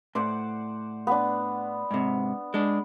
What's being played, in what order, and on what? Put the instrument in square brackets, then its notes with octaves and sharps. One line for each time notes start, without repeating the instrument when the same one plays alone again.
[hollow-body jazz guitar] A2 [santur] C5 D5 F#5
[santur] B3 D4
[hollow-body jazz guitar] G#2 C3
G#3 D4